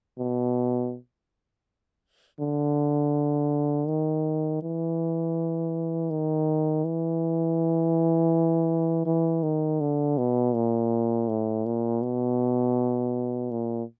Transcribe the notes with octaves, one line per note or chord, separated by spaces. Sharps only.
B2
D3
D#3
E3
D#3
E3
E3
D#3
D3
B2
A#2
A2
A#2
B2
A#2